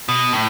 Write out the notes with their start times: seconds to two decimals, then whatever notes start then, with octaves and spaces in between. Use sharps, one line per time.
0.09 B2
0.33 A2